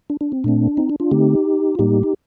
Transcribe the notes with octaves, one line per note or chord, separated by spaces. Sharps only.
D4
D4
C4
A#2 A3 C4 D4
C4 D#4
D4
D4 F4
D3 A3 C4 D#4 G4
F4
A2 G3 A#3 D#4 G4
D#4